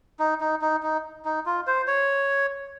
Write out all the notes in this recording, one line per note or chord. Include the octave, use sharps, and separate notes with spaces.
D#4
D#4
D#4
D#4
D#4
F4
C5
C#5